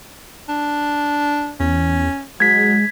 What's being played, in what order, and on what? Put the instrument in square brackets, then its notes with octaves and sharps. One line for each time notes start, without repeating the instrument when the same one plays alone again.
[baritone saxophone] D4
[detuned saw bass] E2 [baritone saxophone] C#4
[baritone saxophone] F#3 [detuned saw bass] G#3 [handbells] G#6 B6